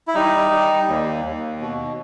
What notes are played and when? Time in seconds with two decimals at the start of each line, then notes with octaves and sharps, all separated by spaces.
0.08 E4
0.15 G3 D#4
0.51 G3
0.88 D#2
1.25 D#2
1.61 B2